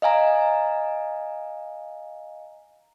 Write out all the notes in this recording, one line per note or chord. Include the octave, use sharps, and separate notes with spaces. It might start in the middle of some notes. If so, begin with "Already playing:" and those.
D#5 F5 G#5 A#5